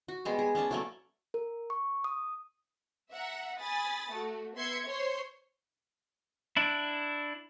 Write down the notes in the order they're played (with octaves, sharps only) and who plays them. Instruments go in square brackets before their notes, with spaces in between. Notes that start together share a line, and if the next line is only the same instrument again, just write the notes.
[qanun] F#4
G3 G#3 B3
G#4
B3 C#4 D5 A5
F#3 A3 A#3
[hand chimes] A#4
C#6
D#6
[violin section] E5 F#5 A#5
G#5 B5 D#6 A6
A3 F#4
B3 E5 C6 G#6 C#7
C5 C#5 C6
[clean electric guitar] D4 E4